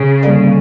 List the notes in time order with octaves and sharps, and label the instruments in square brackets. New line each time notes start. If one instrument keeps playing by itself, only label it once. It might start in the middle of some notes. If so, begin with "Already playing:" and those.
Already playing: [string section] C#3
[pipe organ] D3 G3 A#3